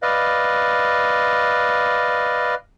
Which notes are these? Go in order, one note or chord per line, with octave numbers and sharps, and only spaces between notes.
B4 D5 D#5 F5